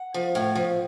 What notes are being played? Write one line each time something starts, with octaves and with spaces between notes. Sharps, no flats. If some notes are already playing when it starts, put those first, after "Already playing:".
Already playing: F#5
F3
A2
F3